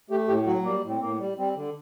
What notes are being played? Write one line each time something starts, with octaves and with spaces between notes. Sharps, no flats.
A3 G4
A2 G4
F#3 F#4
G3 A#3
A2
C4
A2 A#3
G3
G3 C4
D3